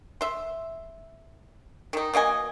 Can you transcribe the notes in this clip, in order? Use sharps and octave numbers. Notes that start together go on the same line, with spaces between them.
E5 C6
D#3 D#4
B2 A#3 D#5 G#5